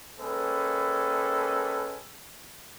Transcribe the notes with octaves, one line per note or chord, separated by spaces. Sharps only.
G#3 A#3 C#4 A4 B4 G5